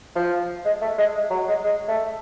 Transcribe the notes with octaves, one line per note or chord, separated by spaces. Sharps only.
F3
G#3
A3
G#3
G#3
F#3
G#3
G#3
A3